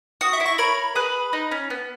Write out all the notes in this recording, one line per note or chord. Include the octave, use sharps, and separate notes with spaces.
F#4 D#6
E5
E4
C#6
A#4 C#5 B5
G#4 B4
D#4
C#4
B3